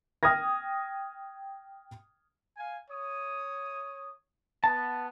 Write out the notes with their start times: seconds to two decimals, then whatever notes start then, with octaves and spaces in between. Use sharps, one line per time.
0.23 G5 D#6 F6 G#6 A#6
2.57 F5 G#5
2.91 C#5 D#6
4.64 B3 A5